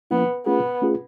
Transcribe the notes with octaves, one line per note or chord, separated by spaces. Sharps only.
F3 A#3 B3 C#4 E4
A3 B3 C#4 F4 G#4
A3 C#4 F4 G#4